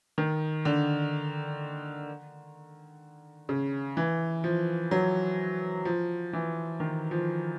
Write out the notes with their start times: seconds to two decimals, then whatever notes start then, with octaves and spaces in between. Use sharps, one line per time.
0.18 D#3
0.65 D3
3.49 C#3
3.97 E3
4.44 F3
4.91 F#3
5.85 F3
6.33 E3
6.80 D#3
7.11 F3